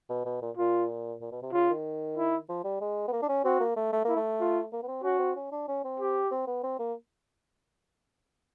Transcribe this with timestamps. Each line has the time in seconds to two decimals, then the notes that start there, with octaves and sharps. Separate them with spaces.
0.10 B2
0.26 B2
0.42 A#2
0.57 A#2 F4
1.21 A#2
1.32 B2
1.43 C3
1.53 C#3 F4
1.70 D#3
2.17 E4
2.49 F3
2.64 G3
2.81 G#3
3.08 B3
3.13 A#3
3.23 D4
3.29 C#4
3.44 C4 F#4
3.60 A#3
3.76 A3
3.93 A3
4.05 A#3 E4
4.16 A3
4.41 F4
4.73 A#3
4.83 B3
4.88 C4
5.04 C#4 F#4
5.19 C4
5.36 C#4
5.52 D4
5.68 C#4
5.84 C4
6.00 G4
6.32 C4
6.47 B3
6.64 C4
6.79 A#3